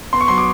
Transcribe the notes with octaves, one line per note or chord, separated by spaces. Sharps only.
B3 C6
C#6
F#3 C6
D6